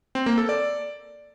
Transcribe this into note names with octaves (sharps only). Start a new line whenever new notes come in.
C4
A#3
A4
D5